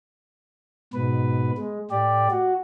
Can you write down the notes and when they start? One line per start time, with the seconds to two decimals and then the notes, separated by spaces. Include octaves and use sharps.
0.93 G#2 B2 B4
1.58 G#3
1.91 A2 G4 D5
2.31 F#4